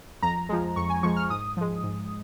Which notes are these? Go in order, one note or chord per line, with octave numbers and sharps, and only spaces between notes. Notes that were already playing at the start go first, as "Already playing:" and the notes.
F2 A#5
F3 G#3
F2 C#6
G#5
F3 G#3 C#6
F6
G#2 D#6
F3 G#3
G#2